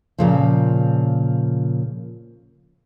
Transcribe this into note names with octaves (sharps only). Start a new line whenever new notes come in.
A#2 C#3 F3